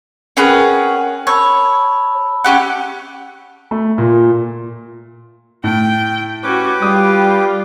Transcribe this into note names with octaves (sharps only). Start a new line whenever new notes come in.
C#4 G#4 A#4 B4 F#5 G5
C#5 A5 B5 E6
C#4 G4 F#5
A3
A#2
A2 G5
C#4 F#4 G4 B4 D6
G3 F4 D#6